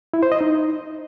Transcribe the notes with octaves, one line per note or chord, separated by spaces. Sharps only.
E4
C5
D#5
D#4